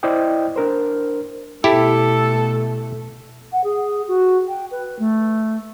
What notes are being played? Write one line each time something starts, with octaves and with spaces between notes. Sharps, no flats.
E4 C5 D5 D#5 G5
D4 A#4 C5
B2 A3 E4 G4 A4
F#5
G#4
F#4
G5
B4
A3